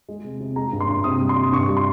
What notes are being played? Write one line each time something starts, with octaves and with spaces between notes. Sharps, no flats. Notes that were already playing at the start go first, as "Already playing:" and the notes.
G#3
C3
C3
G#3 A#5
G2
C6
G2
C3 D#6
G3
C6
C3
G2 C#6
G3
C6